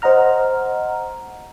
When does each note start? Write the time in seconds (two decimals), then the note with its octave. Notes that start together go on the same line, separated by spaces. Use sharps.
0.02 C5 D#5 F#5 A#5 F6